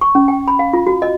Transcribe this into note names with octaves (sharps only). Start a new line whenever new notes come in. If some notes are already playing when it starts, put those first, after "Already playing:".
C#6
C#4
G5
B5
F5
F4
F#4
D#5